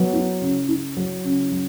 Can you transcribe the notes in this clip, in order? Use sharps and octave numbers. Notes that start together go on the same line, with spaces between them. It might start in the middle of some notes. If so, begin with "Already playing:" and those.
Already playing: F#3 B3
E4
C#3
E4
F#3
C#3
F#3